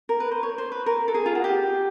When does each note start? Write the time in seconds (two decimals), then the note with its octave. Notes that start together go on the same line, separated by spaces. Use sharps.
0.09 A#4
0.20 B4
0.32 C5
0.43 C#5
0.58 C5
0.72 B4
0.86 A#4
1.08 A4
1.14 G#4
1.26 F4
1.35 F#4
1.44 G4